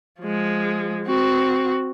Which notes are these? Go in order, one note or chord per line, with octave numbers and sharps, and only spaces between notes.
F3 G#3
C4 F#4